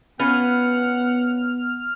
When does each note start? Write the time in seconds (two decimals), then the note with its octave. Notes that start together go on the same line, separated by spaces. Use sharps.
0.19 B3 C#4 F4 B4 F#5 F6